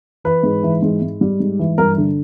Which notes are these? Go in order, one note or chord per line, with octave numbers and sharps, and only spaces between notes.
E3 B4
G#2
E3
G#2
G#2
G3
G#2
E3
G2 A#4
D3